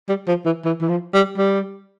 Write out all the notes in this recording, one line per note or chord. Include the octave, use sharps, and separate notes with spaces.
G3
F3
E3
E3
E3
F3
G3
G3